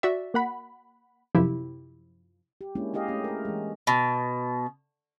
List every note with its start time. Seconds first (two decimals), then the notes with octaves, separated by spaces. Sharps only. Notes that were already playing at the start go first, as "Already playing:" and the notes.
0.03 F#4 D5 E5
0.34 A#3 F#5 B5
1.35 F#2 C3 F3 E4 G4
2.61 G4
2.75 G#3 A#3 C#4 D4 E4
2.93 E4 G4 G#4 D#5 F5
3.08 A3 C#4
3.24 G#4 A#4
3.45 E3 G#3
3.87 B2